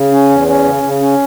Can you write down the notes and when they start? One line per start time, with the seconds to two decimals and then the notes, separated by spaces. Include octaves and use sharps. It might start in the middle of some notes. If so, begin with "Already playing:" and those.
Already playing: C#3
0.11 C#4
0.29 E2
0.47 C#4
0.65 C#3
0.83 C#3
1.01 C#4